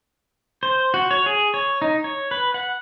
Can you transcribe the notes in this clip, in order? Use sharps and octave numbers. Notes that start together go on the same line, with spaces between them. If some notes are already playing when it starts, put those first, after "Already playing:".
C5
F#4
C#5
G#4
C#5
D#4
C#5
B4
F#5